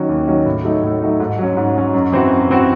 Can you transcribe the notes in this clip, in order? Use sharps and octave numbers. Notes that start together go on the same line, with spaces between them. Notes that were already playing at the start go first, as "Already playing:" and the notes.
Already playing: D#3 F#3 C#4 F#4
D#2
D#3 F#3 C#4 F#4
A2
F#3 A3 D#4
A2
F#3 A3 D#4
G#2
F#3 C#4
G#2
F#3 C#4
F#2
E3 C4 F#4
F#2
E3 C4 F#4